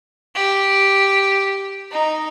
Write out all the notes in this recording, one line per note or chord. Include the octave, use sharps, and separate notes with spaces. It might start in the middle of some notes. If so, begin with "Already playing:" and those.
G4
D#4